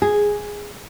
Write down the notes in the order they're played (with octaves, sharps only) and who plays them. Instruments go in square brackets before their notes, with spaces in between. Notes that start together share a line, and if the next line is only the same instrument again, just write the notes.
[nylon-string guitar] G#4